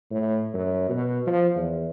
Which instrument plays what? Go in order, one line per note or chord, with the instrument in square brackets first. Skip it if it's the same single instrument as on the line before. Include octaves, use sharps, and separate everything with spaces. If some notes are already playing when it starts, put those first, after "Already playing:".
[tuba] A2
F#2
B2
F3
E2